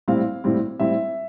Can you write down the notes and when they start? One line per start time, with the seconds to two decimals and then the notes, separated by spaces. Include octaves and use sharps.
0.08 A2 G3 C4 E4 F5
0.44 A2 G3 C4 E4
0.79 A2 G3 C4 E4 E5